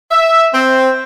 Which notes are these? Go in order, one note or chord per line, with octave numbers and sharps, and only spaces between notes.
E5
C4